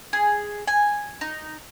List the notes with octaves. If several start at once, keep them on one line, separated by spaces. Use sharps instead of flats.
G#4
G#5
D#4